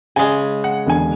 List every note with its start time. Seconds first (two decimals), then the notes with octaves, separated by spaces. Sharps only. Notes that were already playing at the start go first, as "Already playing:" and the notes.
0.16 C#3 G#3 G#5
0.64 F#5
0.86 E1 D3 G#5